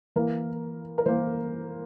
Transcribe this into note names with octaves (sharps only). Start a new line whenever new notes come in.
E3 A#3 A#4
A#4
E3 A#3 C5